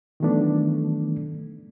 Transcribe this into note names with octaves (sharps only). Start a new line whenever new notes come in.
D#3 E3 F#3 A3 B3 D4